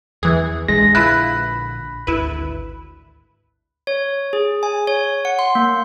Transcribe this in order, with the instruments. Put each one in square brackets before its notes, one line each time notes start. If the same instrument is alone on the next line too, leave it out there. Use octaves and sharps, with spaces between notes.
[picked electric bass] E2 [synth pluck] E3 G#4
[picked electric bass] A#1 D3 [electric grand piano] G#3 [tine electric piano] A#6
[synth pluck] E4 F4 B4 [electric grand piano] B5 F#6
[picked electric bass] G#1 D2 [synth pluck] E4 B4
[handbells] C#5
G#4
G#5
C#5
F#5
C6
A#3